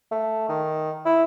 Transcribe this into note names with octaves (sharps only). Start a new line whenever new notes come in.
A3
D#3
E4